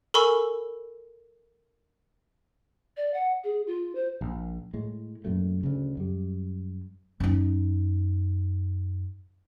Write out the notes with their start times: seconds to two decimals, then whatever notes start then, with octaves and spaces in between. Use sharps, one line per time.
0.14 A4 A#4 G#5 B5 C#6 E6
2.97 D5
3.14 F#5
3.44 G#4
3.67 F4
3.95 C5
4.21 A#1
4.74 A2 G#3
5.25 F#2 A#2 F#3 A3
5.63 D2 C#3
5.97 F#2 G3
7.20 F#2 D#4